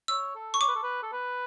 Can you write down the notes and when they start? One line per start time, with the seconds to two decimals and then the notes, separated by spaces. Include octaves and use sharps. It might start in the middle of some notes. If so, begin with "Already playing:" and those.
0.08 C#5 E6
0.35 A4
0.54 C#6
0.61 C#5 D6
0.68 B4
0.75 A4
0.83 B4
1.02 A4
1.13 B4